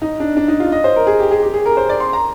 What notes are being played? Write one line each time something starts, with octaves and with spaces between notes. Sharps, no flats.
D#4
D4
D4
D#4
F4
D#5
C5
A#4
G#4
G4
G#4
G4
G#4
A#4
C5
D5
C6
A#5